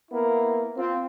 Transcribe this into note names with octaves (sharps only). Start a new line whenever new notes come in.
A#3 B3 E4 A#4
C4 F4